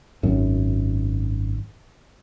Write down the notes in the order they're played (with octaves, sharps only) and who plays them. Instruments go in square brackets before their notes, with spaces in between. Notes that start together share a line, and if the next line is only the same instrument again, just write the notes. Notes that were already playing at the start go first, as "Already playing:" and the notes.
[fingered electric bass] G#1 F#2